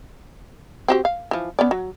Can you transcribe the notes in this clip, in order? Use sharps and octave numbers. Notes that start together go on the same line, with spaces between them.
C4 F#4 G4
F5
E3 F3
B3 C#4 D5
F#3